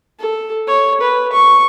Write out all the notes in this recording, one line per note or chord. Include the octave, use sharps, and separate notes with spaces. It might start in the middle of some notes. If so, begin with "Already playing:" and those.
A4
C#5
B4
C#6